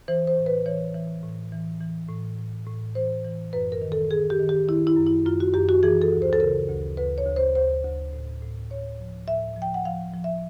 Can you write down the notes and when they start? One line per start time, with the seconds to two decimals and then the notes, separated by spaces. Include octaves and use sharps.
0.08 E3 C5
0.27 C5
0.37 A2
0.46 B4
0.66 E3 C#5
0.95 E3
1.23 A2
1.52 E3
1.81 E3
2.09 A2
2.39 A2
2.66 A2
2.95 E3 C5
3.25 E3
3.53 F#2 B4
3.72 A#4
3.82 D#3
3.92 A4
4.11 D#3 G#4
4.30 G4
4.39 D#3
4.49 G4
4.67 D#3 E4
4.87 E4
4.97 F#2
5.06 E4
5.25 F#2 F4
5.40 F#4
5.54 F#2 G4
5.69 F#4
5.83 E3 G#4
6.02 A4
6.12 D2
6.22 C5
6.33 A4
6.40 C#3 A#4
6.69 D2
6.97 D2 B4
7.18 C#5
7.27 D2
7.36 C5
7.55 D2 C5
7.85 D2
8.13 A2
8.42 A2
8.71 A2 C#5
8.99 F3
9.28 A2 E5
9.56 F3
9.62 G5
9.74 F#5
9.85 F3 F5
10.14 F3
10.24 E5